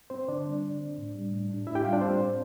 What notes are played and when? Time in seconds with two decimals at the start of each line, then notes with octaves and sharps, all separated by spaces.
0.10 C4 C5
0.28 D3 D4 D5
0.45 G3
0.63 D3
0.81 C4
0.98 A2
1.15 G3
1.31 A2
1.49 D4
1.67 A2 E4 E5
1.75 G4 G5
1.84 G3 F4 F5
1.93 D4 D5
2.01 A2 C4 C5
2.18 D4